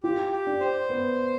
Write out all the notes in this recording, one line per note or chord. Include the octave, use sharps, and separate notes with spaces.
F4 G4
G4
D4
C5
B3